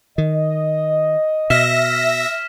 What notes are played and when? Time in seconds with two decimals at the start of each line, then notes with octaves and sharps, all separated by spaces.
0.18 D#3 D#5
1.50 B2 E5 F6 A#6 B6 E7